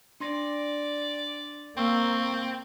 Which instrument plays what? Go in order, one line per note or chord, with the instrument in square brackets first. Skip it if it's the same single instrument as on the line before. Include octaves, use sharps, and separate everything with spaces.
[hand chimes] D4 C6 A#6 [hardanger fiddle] D5
[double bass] A#3 [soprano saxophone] C4 [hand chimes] C#6 E6